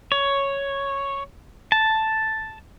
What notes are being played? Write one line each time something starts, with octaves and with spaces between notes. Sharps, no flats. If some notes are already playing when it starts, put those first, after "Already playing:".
C#5
A5